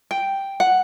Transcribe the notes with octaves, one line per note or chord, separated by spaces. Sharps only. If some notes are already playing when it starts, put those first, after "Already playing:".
G5
F#5